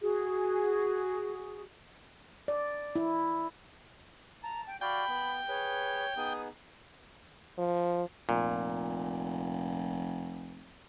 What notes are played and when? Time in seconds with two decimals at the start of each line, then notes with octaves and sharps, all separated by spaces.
0.01 F#4 G#4
2.48 D5
2.96 E4
4.43 A5 A#5
4.67 G5
4.81 F#4 D5 F5 G5 B5
5.08 B3
5.48 G#4 B4 C#5
6.17 B3 D#4 G#4 D#6
7.58 F3
8.29 F1 A#2